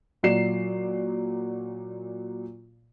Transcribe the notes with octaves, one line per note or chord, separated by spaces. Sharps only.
A#2 F#3 D5 C7 E7